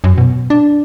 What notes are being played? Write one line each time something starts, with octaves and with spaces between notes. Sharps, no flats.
F#2
B2
D4